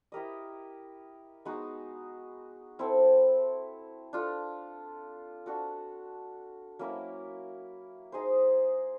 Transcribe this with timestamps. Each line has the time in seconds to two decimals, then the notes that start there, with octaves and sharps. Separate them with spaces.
0.12 E4 G4 A#4 D#5
1.45 G#3 B3 D#4 F#4
2.79 C4 E4 A4
4.13 D4 F4 A4
5.46 D4 F#4 A4
6.79 F#3 A#3 C#4 E4
8.12 D#4 G#4 C5